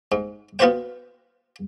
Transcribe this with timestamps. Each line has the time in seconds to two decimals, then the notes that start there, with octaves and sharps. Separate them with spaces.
0.12 G#2
0.59 B3 F4 F#4 B4 C5 G5